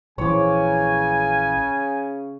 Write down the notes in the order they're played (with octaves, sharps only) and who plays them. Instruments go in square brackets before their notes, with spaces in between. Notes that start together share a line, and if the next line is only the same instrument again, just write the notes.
[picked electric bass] A#1 E3 [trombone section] C#3 [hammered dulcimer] C#5 D6 [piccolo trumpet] G#5